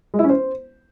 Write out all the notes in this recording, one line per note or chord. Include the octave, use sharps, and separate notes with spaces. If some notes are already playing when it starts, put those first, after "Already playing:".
G#3
E4
C#4
C5